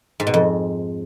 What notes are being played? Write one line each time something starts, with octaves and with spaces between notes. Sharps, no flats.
G#2
B2
F2